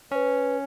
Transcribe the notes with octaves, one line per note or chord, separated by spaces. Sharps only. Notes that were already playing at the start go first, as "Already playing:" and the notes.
C#4 B4 C#5